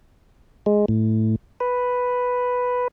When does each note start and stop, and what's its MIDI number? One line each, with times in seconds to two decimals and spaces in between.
0.66 0.85 56
0.88 1.36 45
1.60 2.88 71